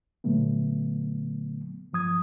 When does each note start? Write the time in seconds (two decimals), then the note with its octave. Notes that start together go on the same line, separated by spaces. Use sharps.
0.24 A#2 D3 F#3 A3 B3
1.93 G2 F3 D#6 G#6